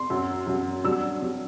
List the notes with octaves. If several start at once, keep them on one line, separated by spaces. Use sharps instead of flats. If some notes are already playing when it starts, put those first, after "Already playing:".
Already playing: C6
F#2 F#3
F#2 F#3
G2 F#3 E6
G2 F#3